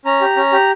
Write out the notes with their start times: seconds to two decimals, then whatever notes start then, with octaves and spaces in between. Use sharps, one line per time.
0.05 C#4 A#5
0.21 G4
0.36 C#4
0.52 G4